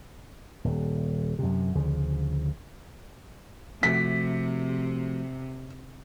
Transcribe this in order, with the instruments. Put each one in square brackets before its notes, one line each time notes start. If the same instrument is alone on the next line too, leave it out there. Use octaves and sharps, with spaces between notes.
[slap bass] D#1
F#2 C3
D2 C#3 F3
[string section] C3 [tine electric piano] F3 A3 F#4 [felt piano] B6